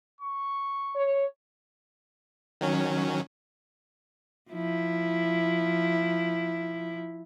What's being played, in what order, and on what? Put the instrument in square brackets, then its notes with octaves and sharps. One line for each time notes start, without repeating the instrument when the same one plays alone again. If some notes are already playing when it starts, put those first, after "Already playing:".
[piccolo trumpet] C#6
[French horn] C#5
[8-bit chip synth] D#3 F#3 C#4
[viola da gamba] F3 E4